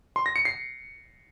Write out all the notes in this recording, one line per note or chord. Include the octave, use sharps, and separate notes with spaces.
C6
A#6
C#7
C7